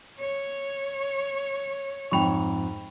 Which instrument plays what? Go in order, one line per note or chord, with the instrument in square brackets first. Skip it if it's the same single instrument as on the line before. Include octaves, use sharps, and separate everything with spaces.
[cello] C#5
[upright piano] F2 G#2 F7 [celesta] G5 B5 C#6